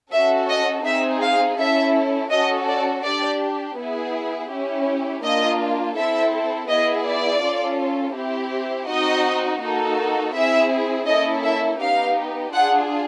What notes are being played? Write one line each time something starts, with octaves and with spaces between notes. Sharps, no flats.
C#4 F#4 A4 E5
D#5
C4 D#4 G#4 E5
F5
C#4 E4 A4 E5
C#4 F#4 A4 D#5
D5
D4 G4 D5
B3 E4 G#4
C#4 E4 G4
A#3 D4 F4 D#5
C4 E4 A4 E5
B3 E4 G#4 D#5
D5
C#4 F4 A4
C4 E4 G4
C4 D#4 F#4 D#5
A#3 D#4 F#4 A4
C4 E4 G#4 E5
A#3 C#4 E4 A4 D#5
E5
B3 D#4 G4 F5
D4 F4 G#4 F#5